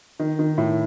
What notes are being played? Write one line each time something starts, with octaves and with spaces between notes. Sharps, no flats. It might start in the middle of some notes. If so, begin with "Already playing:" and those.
D#3
D#3
A2